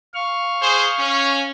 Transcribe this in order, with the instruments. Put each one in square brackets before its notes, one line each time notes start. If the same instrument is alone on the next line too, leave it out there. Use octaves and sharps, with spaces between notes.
[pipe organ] F5 C#6 F6
[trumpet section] G#4 C5
C#4